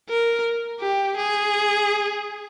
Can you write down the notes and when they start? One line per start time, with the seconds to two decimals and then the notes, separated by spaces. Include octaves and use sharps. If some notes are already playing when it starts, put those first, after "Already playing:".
0.10 A#4
0.80 G4
1.17 G#4